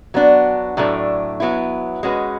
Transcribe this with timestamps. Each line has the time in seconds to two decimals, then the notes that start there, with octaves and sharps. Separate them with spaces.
0.14 F#3 B3 D4 F#4
0.77 A2 F#3 A3 D4
1.40 F#3 B3 E4
2.03 G#3 C#4 F#4 B4